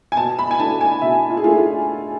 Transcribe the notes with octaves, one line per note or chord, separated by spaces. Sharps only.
G#5
B2 A5
B5
G#5
A3 D4 A5
G#5
B2 E5
F4
G#4
A3 D4 F4
F4